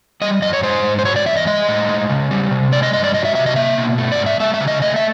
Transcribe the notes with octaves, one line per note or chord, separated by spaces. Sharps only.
G3 D#5
F#2 D#5
C#5
G#3 C5
G#2
C5
F#3 C#5
D5
E2 E5
D#5
G#3 D#5
A2
G#3
C#3
G3
C3
G#3 D5
D#5
G2 D#5
D5
F#3 D#5
E5
C3 E5
D#5
A#3 E5
B2
A3
D5
G#2
E5
G#3 E5
E5
C#3
D#5
A3 D#5
E5